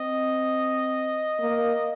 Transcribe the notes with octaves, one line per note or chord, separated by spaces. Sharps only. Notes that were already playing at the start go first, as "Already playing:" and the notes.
Already playing: C4 D#5
A#3